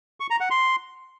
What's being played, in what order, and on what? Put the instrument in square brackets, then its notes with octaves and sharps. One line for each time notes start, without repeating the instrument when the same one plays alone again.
[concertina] C#6
A#5
F#5
C6